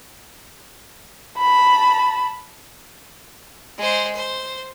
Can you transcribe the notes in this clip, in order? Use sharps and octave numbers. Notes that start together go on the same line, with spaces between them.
A5 B5
G#3 C5
C5